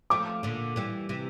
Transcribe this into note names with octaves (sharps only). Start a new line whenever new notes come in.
F3 A3 D6
A#2 D3
E3 G3
C3 E3